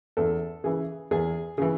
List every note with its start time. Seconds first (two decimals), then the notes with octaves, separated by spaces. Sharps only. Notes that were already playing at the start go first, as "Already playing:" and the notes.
0.17 E2 A4
0.64 C#3 E3 G#4
1.11 E2 G#4
1.58 C#3 E3 G#4